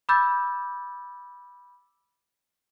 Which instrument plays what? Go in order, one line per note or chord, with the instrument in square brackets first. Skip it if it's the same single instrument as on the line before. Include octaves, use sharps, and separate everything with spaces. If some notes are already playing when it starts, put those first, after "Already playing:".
[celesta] B5 D6 E6 G6 A6